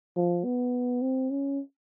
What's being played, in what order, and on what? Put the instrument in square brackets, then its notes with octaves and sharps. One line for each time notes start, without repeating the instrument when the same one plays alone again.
[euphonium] F3
B3
C4
C#4